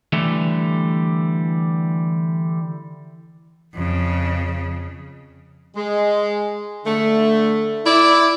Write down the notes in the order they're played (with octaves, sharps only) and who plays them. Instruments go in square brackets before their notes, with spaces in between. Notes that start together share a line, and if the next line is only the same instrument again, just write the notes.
[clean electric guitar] D3 E3 G3 A3
[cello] F2 C#3
[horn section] G#3
D3 A3
E4 D5